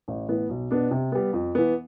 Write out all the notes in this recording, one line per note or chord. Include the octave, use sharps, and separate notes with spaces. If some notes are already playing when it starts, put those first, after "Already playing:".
A1
A2 E3 B3
B1
B2 B3 D4
C3
G3 B3
F2
E3 B3